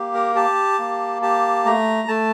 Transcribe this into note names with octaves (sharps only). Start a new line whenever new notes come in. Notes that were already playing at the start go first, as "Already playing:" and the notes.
Already playing: A#3 G4
A#4
G4 A5
A#3
G4 A5
A3 A#5
A3 A5